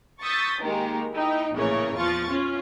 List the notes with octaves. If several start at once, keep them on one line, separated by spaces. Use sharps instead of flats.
C#6 D#6 E6 G6 A6 B6
D#3 G#3 A#3 G4 A#4
D#4 E4 G5
A#1 A2 C#3 E3 A#4 C#5
E2 F3 F4 C#6 A6
C#4 F4